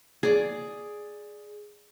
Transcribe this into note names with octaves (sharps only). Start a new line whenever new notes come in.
G#4 D5